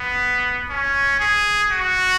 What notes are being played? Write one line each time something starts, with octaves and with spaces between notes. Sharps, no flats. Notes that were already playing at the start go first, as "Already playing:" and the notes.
Already playing: B3
C#4
G#4
F#4